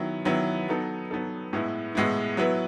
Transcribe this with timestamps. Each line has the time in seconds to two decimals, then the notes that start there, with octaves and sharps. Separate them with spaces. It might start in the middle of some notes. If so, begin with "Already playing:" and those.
Already playing: D#3 F#3 B3 E4
0.25 D#3 F#3 B3 E4
0.69 F#3 B3 D#4 A4
1.11 F#3 B3 D#4 A4
1.53 A2 G#3 B3 E4
1.95 A2 G#3 B3 E4
2.37 F#3 B3 E4 B4